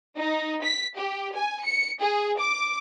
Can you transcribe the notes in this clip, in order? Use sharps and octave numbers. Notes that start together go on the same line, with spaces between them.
D#4
B6
G4
G#5
C#7
G#4
D6